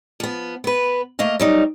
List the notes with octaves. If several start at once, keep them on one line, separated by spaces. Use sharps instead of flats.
F3 B3
B3 B4
A3 A#3 D#5 F5
F#3 G3 D#4